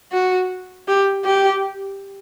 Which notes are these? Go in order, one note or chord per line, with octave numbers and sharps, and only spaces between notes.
F#4
G4
G4